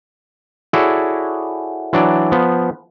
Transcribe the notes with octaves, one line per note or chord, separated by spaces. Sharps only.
E4 F#4 G#4 A4 C#5 D5
E3 F#3 D4 D5
F3 B3